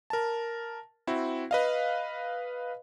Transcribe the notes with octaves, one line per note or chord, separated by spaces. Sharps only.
A#4 A5
C4 E4 F#4
B4 D#5 F5